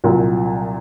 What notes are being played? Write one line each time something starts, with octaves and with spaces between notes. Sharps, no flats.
C2 A#2 F#3